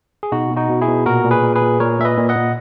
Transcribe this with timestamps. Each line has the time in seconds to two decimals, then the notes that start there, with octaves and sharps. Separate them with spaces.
0.23 G#4
0.32 B2 D#4 F#4
0.50 B2
0.57 D#4 F#4
0.69 B2
0.81 E4 G#4
0.88 B2
1.06 A#2 F#4 A#4
1.25 A#2
1.31 G#4 B4
1.43 A#2
1.55 G#4 B4
1.61 A#2
1.80 A#2 A#4 C#5
1.99 A#2 E5
2.05 B4 D#5
2.17 A#2
2.29 D#5 F#5
2.35 A#2